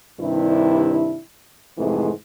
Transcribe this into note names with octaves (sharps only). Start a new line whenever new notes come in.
G2 C3 D#3 D4 E4
F2 G#2 C3 E3 G#3 A3